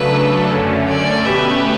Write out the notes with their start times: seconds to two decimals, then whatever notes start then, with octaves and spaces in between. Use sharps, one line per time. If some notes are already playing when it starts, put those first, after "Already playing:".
Already playing: C#3 F#3 A3 D4 A4 B4
0.49 F#2 D3 A3 C#4
0.88 D5
1.25 B2 A3 C#4 G4 B4 E5